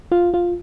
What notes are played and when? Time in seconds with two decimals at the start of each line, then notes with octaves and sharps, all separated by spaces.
0.12 F4
0.34 F4